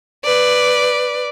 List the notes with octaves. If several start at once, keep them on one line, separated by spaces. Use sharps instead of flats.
B4 D5